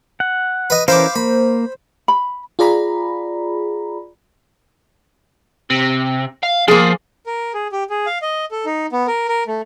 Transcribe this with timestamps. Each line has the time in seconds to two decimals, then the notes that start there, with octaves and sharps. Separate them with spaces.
0.20 F#5
0.70 B4 D#5
0.88 E3 C#4 A#4 C5 F5 B5 D6
1.16 A#3 B5
2.08 B5
2.59 F4 G#4 D5 A#5 B5
5.70 C3
6.43 F5
6.68 F3 A#3 G#4
7.26 A#4
7.54 G#4
7.72 G4
7.90 G#4
8.06 F5
8.22 D#5
8.51 A4
8.66 D#4
8.92 B3
9.08 A#4
9.28 A#4
9.47 A3